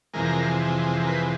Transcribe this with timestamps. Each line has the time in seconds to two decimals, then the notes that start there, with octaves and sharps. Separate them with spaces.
0.13 F2 C3 E3 G#3 A#4
1.03 A#4
1.07 B4